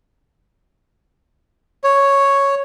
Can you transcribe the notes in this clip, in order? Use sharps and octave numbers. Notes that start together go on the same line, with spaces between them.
C#5